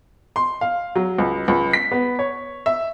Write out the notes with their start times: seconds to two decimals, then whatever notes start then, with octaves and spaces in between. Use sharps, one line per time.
0.36 C6
0.61 F5
0.95 F#3
1.19 C#2
1.48 C#2
1.73 B6
1.91 B3
2.19 C#5
2.66 E5